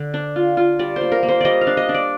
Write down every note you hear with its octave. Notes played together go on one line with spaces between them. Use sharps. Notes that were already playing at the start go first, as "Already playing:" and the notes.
Already playing: D3
D4
F4
F4
G3 D5
C5
A#3
A#4
A#3
C5
G3 D5 D#5
F5
D4
D#5
D4
D5